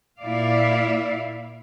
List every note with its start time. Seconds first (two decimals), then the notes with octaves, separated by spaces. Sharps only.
0.20 A#2 E4 D5 F5